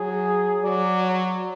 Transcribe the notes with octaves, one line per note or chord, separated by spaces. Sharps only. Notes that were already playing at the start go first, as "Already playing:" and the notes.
Already playing: F#3 G#4
F#3 D5
C#5